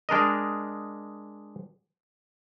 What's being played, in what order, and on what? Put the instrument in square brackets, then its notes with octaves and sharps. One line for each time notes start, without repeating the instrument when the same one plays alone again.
[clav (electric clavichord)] G#3 D4 A#4 D#5